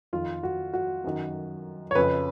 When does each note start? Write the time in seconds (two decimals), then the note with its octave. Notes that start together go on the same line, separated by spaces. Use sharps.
0.13 F2 D#3 F4
0.43 F#4
0.73 F#4
1.04 F#2 D#3
1.91 C#5
1.95 F2 C#3 B4